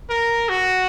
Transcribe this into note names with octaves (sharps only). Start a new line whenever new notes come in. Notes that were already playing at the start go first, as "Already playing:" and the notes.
A#4
F#4